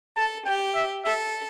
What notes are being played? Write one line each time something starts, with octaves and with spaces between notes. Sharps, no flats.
A4 A5
G4 G5
E5
A4 E5